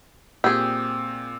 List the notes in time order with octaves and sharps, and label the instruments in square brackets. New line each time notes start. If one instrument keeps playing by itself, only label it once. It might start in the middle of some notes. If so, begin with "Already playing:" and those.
[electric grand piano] A#2 C4 [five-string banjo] G4 G#4 [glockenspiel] E6